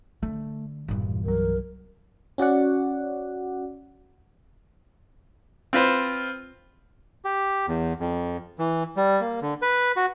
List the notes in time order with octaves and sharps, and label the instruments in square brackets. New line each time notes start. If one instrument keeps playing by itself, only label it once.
[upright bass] D3 [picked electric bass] A3
[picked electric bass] E1 C2 A#2 [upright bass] G2 E3
[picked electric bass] C2 F#3 [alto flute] A#4
[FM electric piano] C#4 F#4 D5 F#5
[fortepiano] C4 F4 B4 C5
[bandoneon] G4
E2
F2
E3
G3
A#3
D3
B4
F#4